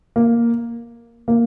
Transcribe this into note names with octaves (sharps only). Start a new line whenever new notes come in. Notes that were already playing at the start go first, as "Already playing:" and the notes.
A#3
A#3